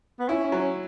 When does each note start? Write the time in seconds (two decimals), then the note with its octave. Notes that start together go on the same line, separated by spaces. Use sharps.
0.19 B3
0.28 C#4 E4
0.44 C#4
0.52 F#3
0.60 C#4